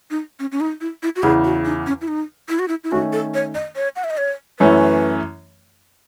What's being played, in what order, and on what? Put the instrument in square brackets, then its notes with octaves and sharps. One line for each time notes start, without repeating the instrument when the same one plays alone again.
[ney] D#4
C#4
C#4
D#4
E4
E4
F#4
[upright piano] E2 C#3 E3 [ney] G#4
[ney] F#4
D#4
C#4
E4
D#4
E4
F#4
E4
E4
[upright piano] D#3 A3 C#4 [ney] F#4
[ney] A4
C#5
D#5
C#5
F#5
E5
D#5
C#5
[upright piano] F#2 E3 A3 C#4 [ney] B4